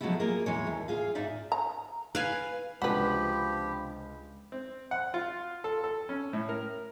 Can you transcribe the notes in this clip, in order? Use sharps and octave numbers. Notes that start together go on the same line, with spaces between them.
F3 F#3 G#3 A3 B3 E4
A#3 F4 G#4 A#4
E2 G#2 E3 G#3 C#5
D#2
F4 G#4 F5
G#2 D#4 D5 E5
A#5
B4 F5 G#5
C#2 C3 F3 D4 F#4 G4 B4 B5
C4
F#5
F4
A4
A4
C#4
A2
A#4